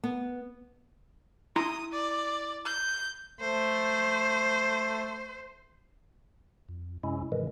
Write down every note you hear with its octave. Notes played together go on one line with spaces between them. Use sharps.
B3
E4 A#5 C6 D#6
D5
G6
A3 C5
F2
F#2 C3 G#3 C#4 E4
G#2 C3 D#3 E3 G#3